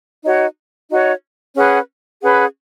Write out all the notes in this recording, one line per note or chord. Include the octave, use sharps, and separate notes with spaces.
D#4 F#4 C#5
D#4 F#4 C#5
C#4 G#4 B4 F#5
C#4 G#4 B4 F#5